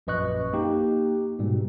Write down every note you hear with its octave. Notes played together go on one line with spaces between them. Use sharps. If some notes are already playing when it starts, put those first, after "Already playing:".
A#1 F#2 B4 D#5 C#6 F#6
A#3 D#4 G4
G#2 B2 G3